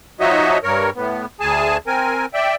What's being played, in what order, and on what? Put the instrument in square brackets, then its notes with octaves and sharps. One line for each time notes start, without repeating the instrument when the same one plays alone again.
[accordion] F3 D#4 F#4 C#5 D#5 E5
G2 A#4 C#5
A2 B3
D2 G#4 G#5 A5
C4 A#4 G#5
D5 E5 G5